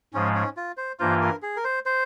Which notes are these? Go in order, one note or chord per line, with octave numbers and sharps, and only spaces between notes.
G#2 F3 G#3 C#4
C#4
F4
C5
G2 E3 A#3 F4 C5
A#4
G#4
A#4
C5
C5